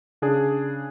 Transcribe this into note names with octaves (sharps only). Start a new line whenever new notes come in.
C#3 D4 G#4